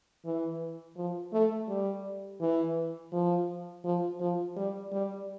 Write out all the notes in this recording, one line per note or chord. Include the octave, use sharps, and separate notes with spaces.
E3
F3
A3
G3
E3
F3
F3
F3
G3
G3